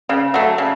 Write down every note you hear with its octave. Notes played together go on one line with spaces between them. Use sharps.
C#3
F#3 A3
C#3